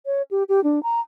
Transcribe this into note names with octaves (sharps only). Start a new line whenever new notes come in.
C#5
G4
G4
D4
A#5